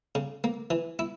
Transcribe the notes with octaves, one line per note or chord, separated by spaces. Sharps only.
C#3
A#3
E3
E4